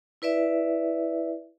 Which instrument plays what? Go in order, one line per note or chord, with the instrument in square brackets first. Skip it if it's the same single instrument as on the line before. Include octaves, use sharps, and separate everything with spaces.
[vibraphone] E4 B4 D5 E5